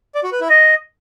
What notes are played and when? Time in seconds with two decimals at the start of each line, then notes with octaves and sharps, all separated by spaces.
0.15 D5
0.24 F#4
0.32 B4
0.41 E4
0.49 D#5